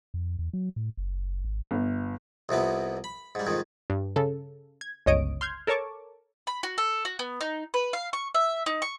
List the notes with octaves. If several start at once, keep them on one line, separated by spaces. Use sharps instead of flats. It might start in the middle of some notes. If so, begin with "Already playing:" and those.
F2
E2
F#3
A2
F#1
G#1
G1
C2 F2 C3 B3
B5
G#2 G3
F2 G#2 D#3
G2
C#3 A4
G#6
G1 C#2 C#5 D#5 D#6 D7
C6 F6 G6 G#6
A4 A#4 C#5 A5 C#6 D6
B5
F#4
A4
F#4
B3
D#4
B4
F5
C#6
E5
D#4
C#6